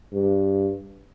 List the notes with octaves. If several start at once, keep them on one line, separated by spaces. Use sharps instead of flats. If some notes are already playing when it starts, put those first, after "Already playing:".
G2